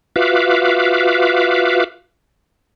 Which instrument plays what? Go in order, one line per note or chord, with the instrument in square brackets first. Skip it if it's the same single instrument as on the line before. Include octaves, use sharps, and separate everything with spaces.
[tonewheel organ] F4 F#4 B4 E5 F5 D6